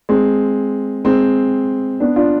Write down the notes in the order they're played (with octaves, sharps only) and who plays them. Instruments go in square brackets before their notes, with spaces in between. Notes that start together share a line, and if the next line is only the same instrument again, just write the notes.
[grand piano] G#3 C4
G#3 C4
B3 D4
D4 F4